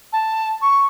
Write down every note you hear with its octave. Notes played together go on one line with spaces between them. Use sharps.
A5
C#6